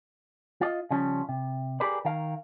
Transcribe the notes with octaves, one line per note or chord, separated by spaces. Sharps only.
F4 D5 D#5
C#3 F3 G3 C#4
C3
G4 G#4 A#4 B4 D5
D#3 A#4 F5